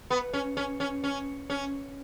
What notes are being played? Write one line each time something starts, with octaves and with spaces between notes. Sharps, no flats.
B3
C#4
C#4
C#4
C#4
C#4